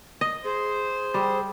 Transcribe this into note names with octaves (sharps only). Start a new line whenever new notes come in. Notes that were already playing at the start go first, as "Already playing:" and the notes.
D#5
G#4 C5
G3